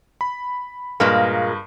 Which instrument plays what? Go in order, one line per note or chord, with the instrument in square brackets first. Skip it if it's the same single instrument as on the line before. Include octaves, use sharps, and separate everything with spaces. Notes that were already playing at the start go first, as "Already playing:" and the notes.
[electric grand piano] B5
[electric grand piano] G2 B4 [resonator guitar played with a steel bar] A#2 G#3 A#3